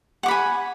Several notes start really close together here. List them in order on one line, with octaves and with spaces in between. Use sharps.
F#5 D6 B5 G#5